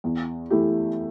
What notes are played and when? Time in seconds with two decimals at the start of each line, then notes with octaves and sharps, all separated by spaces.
0.04 E2
0.50 E3 A3 E4 G4